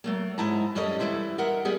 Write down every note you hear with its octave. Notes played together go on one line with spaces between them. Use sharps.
F#3 A3 A#3
G#2 G#3 E4 A5 A#5
F#2 G3 C#4 A4 D#5
E3 F3 G3 E4 B4 C5
A#4 D#5 E5 F#5
G3 B3 G#4